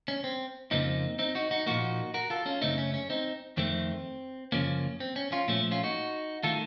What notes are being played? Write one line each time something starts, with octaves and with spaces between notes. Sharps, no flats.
C#4
C4
F2 C#3 F3 A#3 C4 D#4
C4 D#4
D#4 F#4
D#4 F#4
A#2 F3 A#3 D#4 F#4
F#4 A#4
F4 A4
C#4 F4
F#2 C#3 A3 C4 D#4
C#4
C#4
C4 D#4
F2 D#3 A3 C4
F#2 C#3 F3 A#3 C#4
C4
C#4
C#4 F4
A#2 F3 A3 C#4
C#4 F4
D#4 F#4
D#3 A3 F4 A4